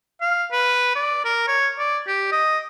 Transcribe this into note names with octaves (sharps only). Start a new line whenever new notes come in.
F5
B4
D5
A#4
C#5
D5
G4
D#5